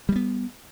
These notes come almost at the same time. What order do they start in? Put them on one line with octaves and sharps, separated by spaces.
G3 G#3 B3